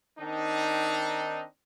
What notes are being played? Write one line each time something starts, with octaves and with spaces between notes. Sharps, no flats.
D#3 C4 D4 D#4